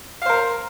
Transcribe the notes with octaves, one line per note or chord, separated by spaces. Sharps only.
A#4 C5 F5